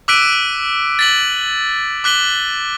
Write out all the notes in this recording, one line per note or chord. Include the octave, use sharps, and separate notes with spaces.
D6 E6 F#6 B6 D7 D#7
A6 B6 F#7
D6 F#6 B6 F#7 G7